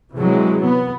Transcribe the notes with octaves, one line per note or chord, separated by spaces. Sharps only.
C3 E3 F#3 G#3
B3